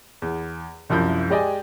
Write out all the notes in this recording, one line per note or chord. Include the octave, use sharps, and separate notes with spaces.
E2
C2 F#2 F3 E4 G6
G#3 G4 D5 D#5 G5 G#5